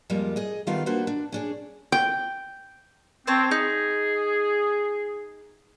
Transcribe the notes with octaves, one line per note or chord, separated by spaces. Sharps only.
F2 G3 G#3 A#3 F4
G#4 D#5
D#3 G3 A3 B3 F4 F5
A#3 D4 F#4 B4 C5
D4
C#4 D4 G#4
G5
C4 C5 C#5 A5
D#4 G#4